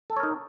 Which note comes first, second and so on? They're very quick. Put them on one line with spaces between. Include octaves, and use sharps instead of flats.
A4 A5 C#5 A#4 D#4